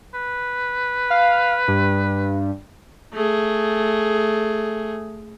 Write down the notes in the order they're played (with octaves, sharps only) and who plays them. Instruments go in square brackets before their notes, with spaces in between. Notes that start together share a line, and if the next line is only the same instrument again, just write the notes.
[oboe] B4
[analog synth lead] F5
G2
[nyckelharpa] A3 G#4